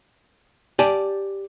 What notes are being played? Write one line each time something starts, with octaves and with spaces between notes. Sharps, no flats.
G4 D5 G#5 A5